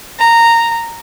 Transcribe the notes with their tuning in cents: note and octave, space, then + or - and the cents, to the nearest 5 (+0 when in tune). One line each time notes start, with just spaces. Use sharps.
A#5 -10